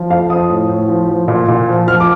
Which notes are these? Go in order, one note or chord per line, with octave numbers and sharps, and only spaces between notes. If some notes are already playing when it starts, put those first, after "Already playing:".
Already playing: F3
F2 F5
F3 D#6
A2
A2
F3
F3
A#2
A#2
F3
F3 F6
D6